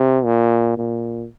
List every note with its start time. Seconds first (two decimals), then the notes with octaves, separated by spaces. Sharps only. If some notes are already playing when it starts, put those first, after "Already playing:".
Already playing: C3
0.25 A#2
0.77 A#2